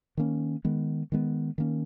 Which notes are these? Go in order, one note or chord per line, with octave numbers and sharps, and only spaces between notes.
D#3 A#3 C#4
D#3 G#3 B3
D#3 G#3 B3
D#3 A#3 C#4